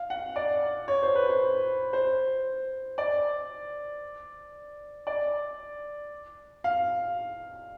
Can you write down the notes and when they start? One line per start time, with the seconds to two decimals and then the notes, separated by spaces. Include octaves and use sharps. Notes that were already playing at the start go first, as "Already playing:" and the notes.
Already playing: F5
0.10 F#5
0.36 D5
0.88 C#5
1.03 C5
1.15 B4
1.29 C5
1.93 C5
2.98 D5
5.07 D5
6.64 F5